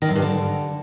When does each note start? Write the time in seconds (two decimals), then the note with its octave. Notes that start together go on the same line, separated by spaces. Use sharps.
0.02 D#3
0.09 F#2
0.15 G2
0.22 D3